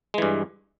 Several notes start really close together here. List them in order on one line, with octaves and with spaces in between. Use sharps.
G#3 E3 G2